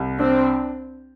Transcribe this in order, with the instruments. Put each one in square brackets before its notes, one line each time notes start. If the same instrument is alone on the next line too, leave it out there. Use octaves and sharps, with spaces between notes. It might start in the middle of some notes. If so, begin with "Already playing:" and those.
Already playing: [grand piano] C2
[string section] C4 [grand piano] D4